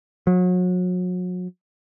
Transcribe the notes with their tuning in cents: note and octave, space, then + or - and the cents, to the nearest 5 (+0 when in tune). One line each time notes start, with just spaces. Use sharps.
F#3 -35